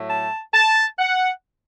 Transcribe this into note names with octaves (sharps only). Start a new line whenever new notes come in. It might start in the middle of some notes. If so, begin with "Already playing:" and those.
Already playing: A2 F#3 A3
A5
A5
F#5